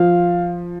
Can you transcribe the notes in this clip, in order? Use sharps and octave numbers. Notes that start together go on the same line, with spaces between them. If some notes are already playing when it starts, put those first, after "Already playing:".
Already playing: F3 F5